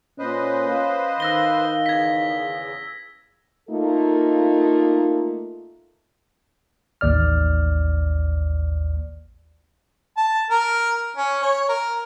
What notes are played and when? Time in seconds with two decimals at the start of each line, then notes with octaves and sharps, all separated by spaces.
0.19 A#2 C#4 B4 C5 D#5
0.69 F5
1.20 D#3 E6 A#6 G7
1.86 E2 C#3 G#6 B6
3.69 A3 A#3 D#4 F4 A4
7.01 A1 D#2 D5 F6
10.17 A5
10.50 A#4
11.17 C#4
11.43 C#5
11.69 A#4